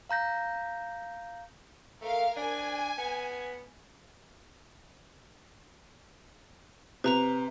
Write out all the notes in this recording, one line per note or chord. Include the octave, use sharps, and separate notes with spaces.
F5 A#5 G6 A#6
A3 A#4 F5
D4 G#5
B3
C3 B4 A#5 F7